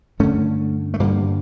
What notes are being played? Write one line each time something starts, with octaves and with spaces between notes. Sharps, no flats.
G2 D3 A3 C#4
A3
G2 D3 G3 A#3